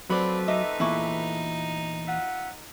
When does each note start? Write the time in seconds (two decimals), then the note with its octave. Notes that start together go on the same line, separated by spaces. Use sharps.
0.10 F3 F#3 A3 C4 B4 D5 B5
0.48 D#4 D#5 E5 D6
0.80 E2 A#2 E4 C#6 D6
2.08 F4 E5 F#5